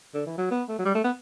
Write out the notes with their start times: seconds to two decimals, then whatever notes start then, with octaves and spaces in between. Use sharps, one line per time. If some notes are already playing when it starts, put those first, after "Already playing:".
0.14 D3
0.26 E3
0.38 F#3
0.51 B3
0.69 A3
0.78 F#3
0.85 G3
0.95 A3
1.04 B3